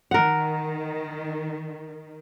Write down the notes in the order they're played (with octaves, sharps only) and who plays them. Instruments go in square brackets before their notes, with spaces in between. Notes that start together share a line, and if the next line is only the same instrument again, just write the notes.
[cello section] D#3 [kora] A#4 F#5